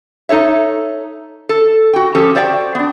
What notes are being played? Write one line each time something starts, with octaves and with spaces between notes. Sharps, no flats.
D#4 A4 C#5 E5
A4
F#4 G5
F3 C#4 G4 A4
F#4 C5 D5 E5 G5
B3 D4